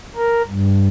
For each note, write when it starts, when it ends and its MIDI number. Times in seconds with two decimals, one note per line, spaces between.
0.16 0.42 70
0.48 0.88 43